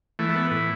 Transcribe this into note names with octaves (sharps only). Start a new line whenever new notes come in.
E3 A3
A3
B3
A2